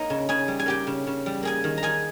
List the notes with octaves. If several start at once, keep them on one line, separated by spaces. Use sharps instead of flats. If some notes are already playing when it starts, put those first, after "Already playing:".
Already playing: A#3 D#4 D#5
C#3
C#3 G#4 G#5
G3
G#5
A#3 G4 G5
C#3
C#3
G3
A#3 G#4 G#5
D#3
A#5
D#3 G#4 G#5